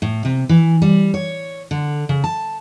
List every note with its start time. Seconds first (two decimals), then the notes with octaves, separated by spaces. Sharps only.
0.02 A2
0.25 C3
0.49 E3
0.82 G3
1.14 C#5
1.71 D3
2.09 C#3
2.24 A5